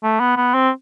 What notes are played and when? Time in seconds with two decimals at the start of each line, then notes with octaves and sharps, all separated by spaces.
0.03 A3
0.20 B3
0.37 B3
0.54 C4